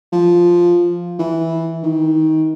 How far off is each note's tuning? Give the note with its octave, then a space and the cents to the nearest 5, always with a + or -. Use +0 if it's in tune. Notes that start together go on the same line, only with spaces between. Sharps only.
F3 +0
E3 -10
D#3 +20